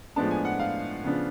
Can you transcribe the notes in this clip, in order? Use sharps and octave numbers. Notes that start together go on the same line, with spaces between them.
A2 F3 G#3 B3 D4 A5
G#5
F#5
F5
C#3 F3 B3 D4